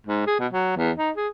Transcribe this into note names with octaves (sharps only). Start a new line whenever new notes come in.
G#2
G#4
B2
F#3
E2
D#4
G#4